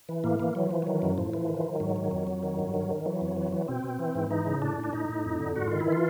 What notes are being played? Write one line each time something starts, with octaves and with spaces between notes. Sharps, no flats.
E3
A2 A#3
E3 A#3
E3 F#3
E3 F3
D#3 F#3
F#2
A2 F3
E3 F3
D#3
D#3
G#2 F#3
D#3
F2
F2
D#3
G2
D#3
D#3
E3 F#3
F2
E3
E3
B2 C4
B2
E3
G#2
E3 D#4
C#3
A2 D4
A2
D4
A2 D#4
A2
F2
D3
G#2 F#4
D#3 F4
E4
E3 F4